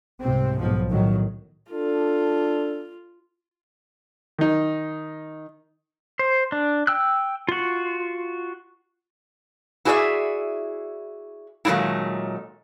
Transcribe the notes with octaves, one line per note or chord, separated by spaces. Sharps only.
C2 G#2 C3 C4
B1 G#2 B2 F3
A2 D#3 F#3
D4 F4 A4
D#3 D#4
C5
D4
G5 E6 F#6
F4 F#4
E4 F#4 G#4 A4 D5 E5
A#2 D#3 F#3 G#3 A3 E4